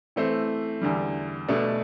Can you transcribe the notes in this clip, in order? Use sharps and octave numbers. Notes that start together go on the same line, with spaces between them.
E3 A3 C4
E2 D3 G3
B2 A3 D4